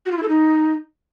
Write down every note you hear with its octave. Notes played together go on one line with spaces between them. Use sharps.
F#4
F4
E4
A4
D#4